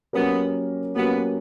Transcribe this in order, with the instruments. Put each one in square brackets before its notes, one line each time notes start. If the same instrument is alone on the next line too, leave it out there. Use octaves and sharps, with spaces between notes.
[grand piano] F#3 A#3 C#4 G4 A#4 [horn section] B3
[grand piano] F#3 A#3 C#4 G4 A#4 [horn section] B3